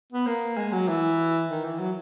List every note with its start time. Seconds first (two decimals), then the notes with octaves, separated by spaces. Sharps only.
0.12 B3
0.27 A#3
0.57 G#3
0.73 F#3
0.88 E3
1.50 D#3
1.64 E3
1.79 F#3